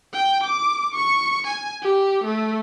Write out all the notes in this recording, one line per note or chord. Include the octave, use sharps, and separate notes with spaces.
G5
D6
C#6
G#5
G4
A3